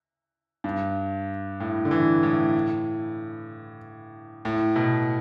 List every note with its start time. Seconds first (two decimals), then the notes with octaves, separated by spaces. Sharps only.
0.64 G2
1.60 A2
1.85 D3
1.91 E3
2.23 A2
4.45 A2
4.76 B2